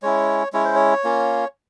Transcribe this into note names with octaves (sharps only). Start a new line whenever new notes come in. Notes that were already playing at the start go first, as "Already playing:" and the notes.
G#3 C#4 E4 C#5
G#3 C#4 E4 C#5
C5
C#5
A#3 C#4 F4